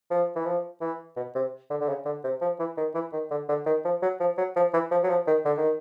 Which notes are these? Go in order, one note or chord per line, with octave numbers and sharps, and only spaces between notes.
F3
E3
F3
E3
B2
C3
D3
D3
C#3
D3
C3
F3
E3
D#3
E3
D#3
D3
D3
D#3
F3
F#3
F3
F#3
F3
E3
F3
F#3
F3
D#3
D3
D#3